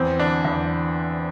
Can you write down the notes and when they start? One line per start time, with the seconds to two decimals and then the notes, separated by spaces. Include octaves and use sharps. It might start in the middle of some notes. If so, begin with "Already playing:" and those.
Already playing: E2 C4
0.19 D3 D4
0.45 E2